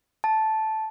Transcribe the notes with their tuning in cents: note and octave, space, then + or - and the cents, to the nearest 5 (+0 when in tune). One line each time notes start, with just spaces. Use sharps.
A5 -10